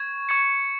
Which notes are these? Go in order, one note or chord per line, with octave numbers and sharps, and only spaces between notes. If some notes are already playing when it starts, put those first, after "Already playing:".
Already playing: C#6 G#6
C#6 G#6 C#7